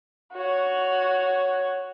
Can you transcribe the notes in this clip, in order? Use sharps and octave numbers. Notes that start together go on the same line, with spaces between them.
F#4 C#5